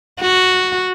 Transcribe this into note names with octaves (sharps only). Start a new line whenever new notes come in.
F#4